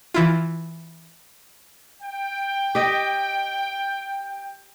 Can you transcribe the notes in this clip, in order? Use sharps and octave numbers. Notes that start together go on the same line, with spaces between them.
E3 E4 F4
G5
G4 D#5